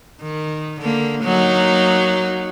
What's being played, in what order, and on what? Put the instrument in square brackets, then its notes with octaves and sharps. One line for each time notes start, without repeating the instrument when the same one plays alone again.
[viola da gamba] D#3
D3 A#3
F#3 A#3 D#4